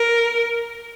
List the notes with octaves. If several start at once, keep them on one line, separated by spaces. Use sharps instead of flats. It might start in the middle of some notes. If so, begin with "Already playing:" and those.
Already playing: A#4